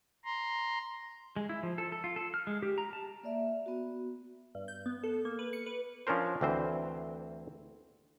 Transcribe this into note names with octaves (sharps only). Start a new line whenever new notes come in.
A#5 C6
G#3
E4
F3
A4
A4
F4
A4
F6
G#3
G4
A#5
A5
A#3 D5 E5
B3 F#4
G2
G6
B3
A4
A#3
B4
C#7
B4
F3 C#4 D4 A#4 C5
D2 E3 C4 C5